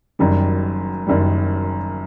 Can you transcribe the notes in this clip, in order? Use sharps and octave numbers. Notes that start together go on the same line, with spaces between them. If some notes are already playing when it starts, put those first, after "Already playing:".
F#1 F#2 D#3 G3
F#1 F#2 D#3 G3